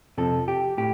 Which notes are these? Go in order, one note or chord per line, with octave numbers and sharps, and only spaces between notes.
F2 C3 F3 C4 A4
G4
A2 G4